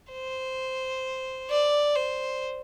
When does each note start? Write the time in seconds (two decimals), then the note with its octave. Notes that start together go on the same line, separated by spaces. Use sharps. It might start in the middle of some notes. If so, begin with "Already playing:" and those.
0.12 C5
1.50 D5
1.96 C5